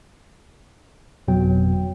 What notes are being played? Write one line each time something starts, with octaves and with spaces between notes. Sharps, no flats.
G1 F2 B2 F#3 G5